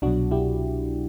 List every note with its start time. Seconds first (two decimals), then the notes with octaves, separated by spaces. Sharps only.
0.02 C2 B2 F#3 D4 F#4
0.31 E4 G4